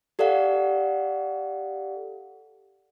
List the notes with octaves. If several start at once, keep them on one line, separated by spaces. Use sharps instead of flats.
G4 A4 D5 F5 F#5